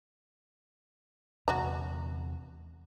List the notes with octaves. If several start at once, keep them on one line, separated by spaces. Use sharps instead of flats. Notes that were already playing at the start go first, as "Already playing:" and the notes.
E2 C3 F#3 F#4 A#5